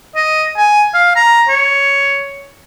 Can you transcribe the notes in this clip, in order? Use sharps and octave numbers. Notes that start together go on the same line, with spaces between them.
D#5
G#5
F5
A#5
C#5